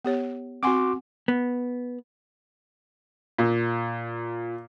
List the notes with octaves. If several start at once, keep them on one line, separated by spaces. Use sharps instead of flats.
B3 G4 C#5
C4 F#4 F#5 G#5 C6 D6
B3
A#2